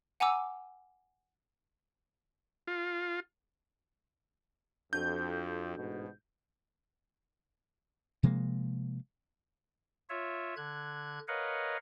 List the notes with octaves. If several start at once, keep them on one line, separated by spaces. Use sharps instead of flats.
F#5 G#5 A#5 D6 E6
F4
F2 D4 F#4 A4 G6
A1 G#2 B2
C3 F3 G#3 A#3
F4 C#5 E5
D3 F#6 G#6
A#4 B4 C#5 D#5 F5 F#5